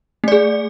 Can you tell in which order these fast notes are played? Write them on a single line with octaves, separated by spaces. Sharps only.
A3 D5 G#4